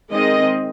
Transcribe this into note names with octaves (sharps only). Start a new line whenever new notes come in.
D#3 G#3 C4 D#5